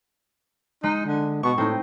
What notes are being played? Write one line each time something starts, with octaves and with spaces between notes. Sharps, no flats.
G#3 D#4
D3
B2 C#6
A2 C4 D#4